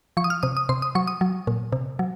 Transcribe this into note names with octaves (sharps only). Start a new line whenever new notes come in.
F3 C#6
D#6
F6
C3 D#6
D#6
C3 C6
D#6
F#3 C#6
D#6
F#3
A#2
C3
F#3